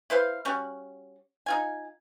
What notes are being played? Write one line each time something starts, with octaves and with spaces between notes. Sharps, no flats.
E4 B4 C5 F5
G3 C#4 F#4
D#4 F4 G#5